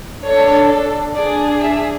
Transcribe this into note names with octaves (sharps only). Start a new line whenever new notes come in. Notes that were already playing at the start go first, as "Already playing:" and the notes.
D4 A4 C#5
D4 G#4 D5
E5